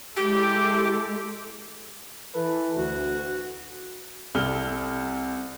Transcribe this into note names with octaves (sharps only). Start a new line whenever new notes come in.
G#3 E4 G4 A4
E3 A4 B4
D2 F#4
C2 C3 A4 F6 G7